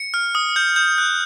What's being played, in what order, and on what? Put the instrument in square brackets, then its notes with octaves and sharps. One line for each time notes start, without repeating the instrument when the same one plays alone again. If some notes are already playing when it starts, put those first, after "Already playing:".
Already playing: [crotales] C#7
F6
D#6
G6
G6
F#6